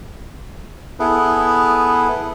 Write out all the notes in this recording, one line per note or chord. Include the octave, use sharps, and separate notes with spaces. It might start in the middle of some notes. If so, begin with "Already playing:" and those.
B3 E4 G#4 A4 B4